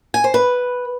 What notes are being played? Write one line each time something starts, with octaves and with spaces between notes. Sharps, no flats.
G#5
C5
B4